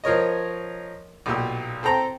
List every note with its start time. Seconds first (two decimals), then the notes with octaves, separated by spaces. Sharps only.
0.04 F3 A#4 C#5 D#5
1.26 B1 A#2 G4 E6
1.83 C4 A4 G5 A#5